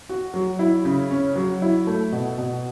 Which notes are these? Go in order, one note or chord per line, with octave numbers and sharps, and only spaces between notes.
F#4
F#3
E4
C#3
C#4
F#3
E4
A3
B2
B2